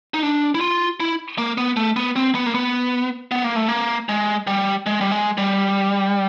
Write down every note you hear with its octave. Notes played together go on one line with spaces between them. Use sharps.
D#4
D4
E4
F4
E4
A#3
B3
A3
B3
C4
B3
A#3
B3
B3
A#3
A3
A#3
G#3
G3
G#3
G3
G#3
G3